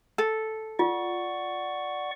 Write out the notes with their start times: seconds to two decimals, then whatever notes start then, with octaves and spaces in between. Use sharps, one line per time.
0.18 A4
0.79 F4 D5 F#5 C#6